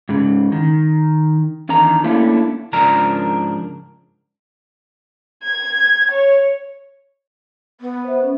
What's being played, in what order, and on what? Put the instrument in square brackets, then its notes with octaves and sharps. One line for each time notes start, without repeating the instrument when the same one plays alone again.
[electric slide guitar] G#2 C#3
D#3
E2 D#3 D4 A#5
A3 A#3 C#4 D4 E4
[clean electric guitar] G#2 C#3 F3 D4 A#4 A#5
[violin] G#6
C#5
[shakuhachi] B3
[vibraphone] C5 E5
C#4